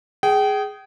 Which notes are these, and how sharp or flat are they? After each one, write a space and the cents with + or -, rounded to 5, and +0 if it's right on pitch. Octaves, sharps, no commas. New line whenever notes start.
G#4 +0 G5 -30